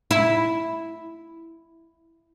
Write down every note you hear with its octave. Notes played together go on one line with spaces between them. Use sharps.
E4